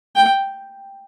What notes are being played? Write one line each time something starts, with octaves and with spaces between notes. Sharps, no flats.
G5